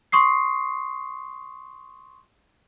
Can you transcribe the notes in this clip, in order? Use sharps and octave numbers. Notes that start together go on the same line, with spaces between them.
C6 C#6 D#6 C7